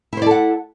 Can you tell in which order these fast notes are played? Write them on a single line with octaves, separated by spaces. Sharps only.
E4 C5 D5 A4 F#5